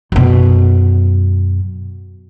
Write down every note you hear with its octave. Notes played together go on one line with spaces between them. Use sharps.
F#2 B2